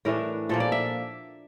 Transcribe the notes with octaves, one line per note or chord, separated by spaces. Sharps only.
A2 E3 A3 D4 A#4
A#2 F3 A#3 A4
D5
E5